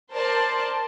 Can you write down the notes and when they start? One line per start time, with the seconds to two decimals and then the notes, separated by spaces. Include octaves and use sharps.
0.13 A#4 C5 D5 A5 C6